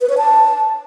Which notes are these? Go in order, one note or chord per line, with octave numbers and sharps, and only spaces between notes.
B4
C#5
A5